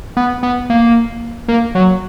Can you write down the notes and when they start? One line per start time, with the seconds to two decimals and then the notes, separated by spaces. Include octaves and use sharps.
0.17 B3
0.43 B3
0.70 A#3
1.48 A#3
1.75 F#3